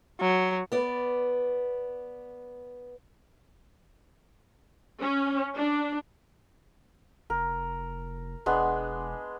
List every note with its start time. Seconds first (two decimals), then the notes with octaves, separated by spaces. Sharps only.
0.20 F#3
0.72 B3 D5
5.00 C#4
5.54 D4
7.30 F1 A#4
8.46 E1 G#3 B3 D4